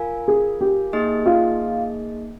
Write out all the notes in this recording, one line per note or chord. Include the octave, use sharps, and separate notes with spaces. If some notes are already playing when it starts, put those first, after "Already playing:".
Already playing: F4 A#4 F5 G#5
G#4
G4
A#3 D#4 G#4 D#5
F4